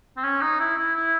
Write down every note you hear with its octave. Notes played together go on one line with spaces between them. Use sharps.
C4
C#4
D#4
E4
E4
E4